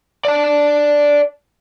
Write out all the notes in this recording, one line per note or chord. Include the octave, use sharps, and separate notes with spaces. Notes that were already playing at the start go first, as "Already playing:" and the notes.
D5 A5